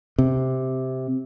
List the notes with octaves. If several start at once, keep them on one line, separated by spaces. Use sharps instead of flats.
C3